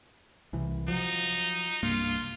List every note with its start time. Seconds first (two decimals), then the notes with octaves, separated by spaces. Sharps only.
0.53 C2 E3
0.88 F3 F#3 D#4
1.83 C2 G2 A#3 F4